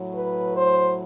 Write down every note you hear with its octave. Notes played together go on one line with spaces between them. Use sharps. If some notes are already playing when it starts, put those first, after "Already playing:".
Already playing: A2 F#3
B4
C5